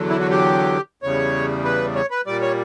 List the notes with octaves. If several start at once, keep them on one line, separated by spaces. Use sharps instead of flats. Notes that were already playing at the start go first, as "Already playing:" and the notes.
Already playing: E2 D3 F#3
E4
F#4
G4
E2 C#3 G3 C#5
B4
C#5
B4
A#2 G3 D5
C#5